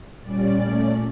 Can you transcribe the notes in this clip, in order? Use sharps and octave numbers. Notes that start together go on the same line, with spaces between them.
A#2 G3 C#4 D5
A#2 A3 C#4